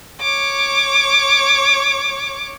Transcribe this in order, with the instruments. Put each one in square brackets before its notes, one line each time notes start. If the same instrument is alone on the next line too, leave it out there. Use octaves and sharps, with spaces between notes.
[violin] C#5 D6